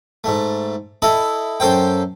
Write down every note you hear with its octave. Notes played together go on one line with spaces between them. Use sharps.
G#2 A3
E4 A4 D#5
F#2 A4 C5 G5